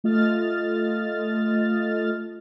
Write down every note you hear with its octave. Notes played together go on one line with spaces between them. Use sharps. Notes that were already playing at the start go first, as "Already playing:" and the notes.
A3 F4 D#5 F6 A6